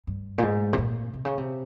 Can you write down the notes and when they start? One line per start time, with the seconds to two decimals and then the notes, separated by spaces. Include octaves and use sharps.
0.07 G2
0.38 A#2
0.43 G#2
0.73 C3
0.78 A#2
1.14 C3
1.25 C#3
1.38 C3